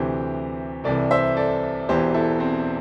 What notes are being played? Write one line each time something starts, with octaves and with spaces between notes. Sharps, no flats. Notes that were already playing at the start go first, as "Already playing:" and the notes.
Already playing: D2 C3 E3 G4 C5
C2 C3 E3 A4 D5
C5 E5
A4 D5
E1 E2 E3 G4 C5
E4 A4
C4